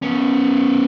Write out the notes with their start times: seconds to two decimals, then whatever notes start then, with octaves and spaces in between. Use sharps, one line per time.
0.03 B3 C#4